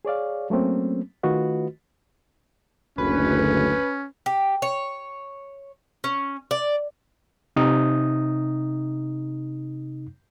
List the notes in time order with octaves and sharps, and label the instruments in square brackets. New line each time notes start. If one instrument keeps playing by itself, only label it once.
[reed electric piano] G#4 C#5 D5 F5
F#3 A3 A#3 C4 C#4
D#3 A3 F4 F#4 B4 D#5
[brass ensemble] F#1 D2 [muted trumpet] C#4 [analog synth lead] B4
[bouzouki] G4
C#5
C#4
D5
[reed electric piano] C3 D#4 D#6